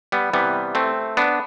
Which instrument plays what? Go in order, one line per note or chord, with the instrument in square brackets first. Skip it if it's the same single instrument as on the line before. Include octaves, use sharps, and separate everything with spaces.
[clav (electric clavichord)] G3 B3
C3 E3 G3 B3
A3 C4
B3 D4